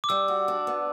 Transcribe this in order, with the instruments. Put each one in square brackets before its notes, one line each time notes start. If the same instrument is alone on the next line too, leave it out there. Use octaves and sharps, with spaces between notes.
[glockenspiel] D6
[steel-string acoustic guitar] G3 [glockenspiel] E6
[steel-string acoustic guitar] F#4
D4
B3